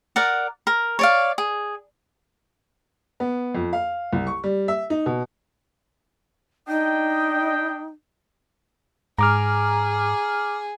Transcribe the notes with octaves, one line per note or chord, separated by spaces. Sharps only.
A#4 D5 F#5
A#4
C#5 D5 F5
G#4
B3
F2
F5
C2
C#6
G3
E5
D#4
B2
D4 D#4 D#5 G5
G#2 G#4 A#5 D6 F6